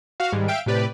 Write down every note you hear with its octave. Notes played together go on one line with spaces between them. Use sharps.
F#4 F5
G#2 D#3 G3 G#3
E5 F5 G5 D7
A2 C3 G4 B4 D5